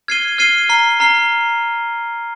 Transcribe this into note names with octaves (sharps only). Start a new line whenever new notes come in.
F6 G#6 C7 D#7 G7
F6 G#6 C7 D#7 G7
A#5 F6 C7 G7
A#5 F6 C7 G7